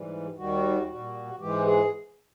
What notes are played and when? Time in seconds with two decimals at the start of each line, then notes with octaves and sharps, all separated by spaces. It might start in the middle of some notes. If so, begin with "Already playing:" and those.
Already playing: G#2 E3 G3
0.37 D#2 D#3 G3 F#4
0.88 A#2 G3 F#4
1.40 G#2 E3 G#3 G4
1.65 G#4